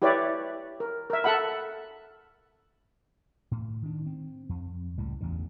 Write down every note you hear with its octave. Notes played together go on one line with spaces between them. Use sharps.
E4 G4 B4 C#5 D5 E5
A#4
A#4 E5
A4 E5 F#5 B5
A2
D#3 D4
C4
F2
C#2 A2 G3
A1 E2 A2 D3